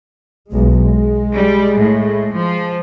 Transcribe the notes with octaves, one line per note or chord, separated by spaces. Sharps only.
B1 G#3
G#3
G3
A2
F3